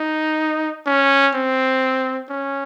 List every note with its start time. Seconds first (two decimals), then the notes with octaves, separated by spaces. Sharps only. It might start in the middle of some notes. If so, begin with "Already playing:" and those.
Already playing: D#4
0.87 C#4
1.34 C4
2.29 C#4